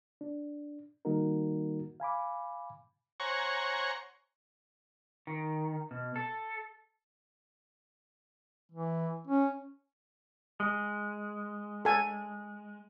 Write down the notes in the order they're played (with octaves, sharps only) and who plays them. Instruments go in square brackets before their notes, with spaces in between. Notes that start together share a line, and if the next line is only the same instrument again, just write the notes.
[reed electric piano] D4
D#3 G3 A#3 D#4 F#4 A#4
F5 G#5 B5 D6
[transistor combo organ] C5 C#5 F#5 G#5 A#5 C#6
[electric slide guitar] D#3
B2
A4
[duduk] E3
C#4
[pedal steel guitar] G#3
[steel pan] A4 G#5